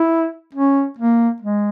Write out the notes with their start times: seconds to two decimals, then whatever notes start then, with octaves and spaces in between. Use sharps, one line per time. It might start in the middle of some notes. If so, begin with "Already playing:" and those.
Already playing: E4
0.55 C#4
0.98 A#3
1.42 G#3